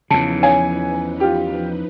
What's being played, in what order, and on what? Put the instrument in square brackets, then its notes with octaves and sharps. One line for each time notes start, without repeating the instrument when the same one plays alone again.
[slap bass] E2 C#3 [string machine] F3 D#4 B4 [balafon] A5
[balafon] C#5 F5 [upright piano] G#5
[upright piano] F4 G4